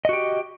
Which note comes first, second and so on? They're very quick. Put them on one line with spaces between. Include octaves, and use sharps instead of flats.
D#5 F#4 G4